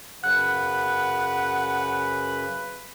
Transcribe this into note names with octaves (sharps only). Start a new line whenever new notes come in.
F#2 C#3 B4 F#5 F#6